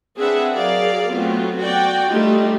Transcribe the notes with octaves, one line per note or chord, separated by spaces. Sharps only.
C4 D4 G#4 B4 E5 F#5
F#3 G#4 A#4 D5 F5
F#3 A3 B3 C4 F4
F#4 D5 G5
G3 A3 D4 D#4 F4 G4